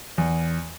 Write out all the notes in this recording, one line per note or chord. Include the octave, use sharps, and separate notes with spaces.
E2